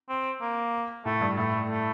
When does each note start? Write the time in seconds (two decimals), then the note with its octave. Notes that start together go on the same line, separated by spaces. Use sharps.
0.09 C4
0.41 A#3
1.05 A2 A3
1.21 G2
1.37 A2 A3
1.70 A3